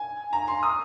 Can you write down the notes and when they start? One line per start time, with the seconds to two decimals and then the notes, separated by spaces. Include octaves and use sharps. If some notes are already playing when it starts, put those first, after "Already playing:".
Already playing: G#5
0.33 A#5
0.48 C6
0.63 D#6